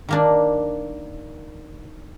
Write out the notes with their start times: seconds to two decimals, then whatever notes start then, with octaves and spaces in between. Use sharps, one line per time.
0.09 D#3 A#3 D4